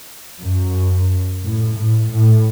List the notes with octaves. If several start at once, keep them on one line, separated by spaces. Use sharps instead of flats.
F#2
A2
A2
A2